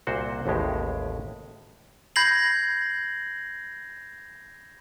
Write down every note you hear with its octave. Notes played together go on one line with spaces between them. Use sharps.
C2 A#2 F#4 C5
A1 D#2 A2 G#3 G4
B5 G6 G#6 A#6 C7 F#7